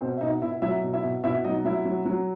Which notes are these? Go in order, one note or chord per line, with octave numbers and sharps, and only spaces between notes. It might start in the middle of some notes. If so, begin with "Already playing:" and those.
B2 C4 C5
E5
B2 D#4 D#5
B2 E4 E5
F#3 E4 E5
B2
E4 E5
B2
B2 E4 E5
F#3 D#4 D#5
F#3 E4 E5
F#3
F#3